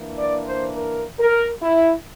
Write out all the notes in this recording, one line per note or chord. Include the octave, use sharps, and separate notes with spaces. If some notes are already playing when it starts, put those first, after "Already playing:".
Already playing: E3 A#3 D4
D5
C5
A#4
A#4
E4